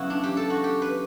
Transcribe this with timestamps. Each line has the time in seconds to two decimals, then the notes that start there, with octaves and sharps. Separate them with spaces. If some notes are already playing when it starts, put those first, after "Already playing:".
Already playing: C#3 F#3 B3 E4 F#4
0.10 D4
0.24 G4
0.37 A4
0.50 F#4
0.64 G4
0.82 B4